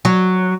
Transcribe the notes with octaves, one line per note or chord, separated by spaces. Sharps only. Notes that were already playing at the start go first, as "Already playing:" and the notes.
F#3